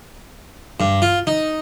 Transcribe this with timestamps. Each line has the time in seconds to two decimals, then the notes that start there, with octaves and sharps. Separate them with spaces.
0.80 G2
1.02 F4
1.27 D#4